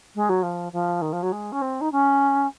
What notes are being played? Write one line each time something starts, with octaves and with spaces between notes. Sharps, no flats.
G#3
F#3
F3
F3
D#3
F3
F#3
G#3
C#4
C4
D#4
C#4